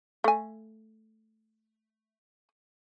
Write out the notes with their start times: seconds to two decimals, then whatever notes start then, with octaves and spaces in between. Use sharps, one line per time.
0.24 A3 G#5